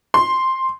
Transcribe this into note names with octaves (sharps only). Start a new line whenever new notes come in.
C6